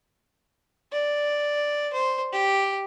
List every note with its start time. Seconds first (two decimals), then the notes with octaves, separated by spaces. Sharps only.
0.92 D5
1.93 C5
2.33 G4